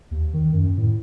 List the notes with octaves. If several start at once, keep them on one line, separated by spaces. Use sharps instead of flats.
D#2
D#3
F#2
A2